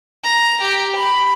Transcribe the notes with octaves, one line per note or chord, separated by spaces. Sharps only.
A#5
G4
B5